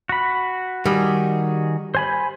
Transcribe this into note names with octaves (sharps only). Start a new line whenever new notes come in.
F#4 B5
D#3 G3 F#4 G#4
C5 G#5 B5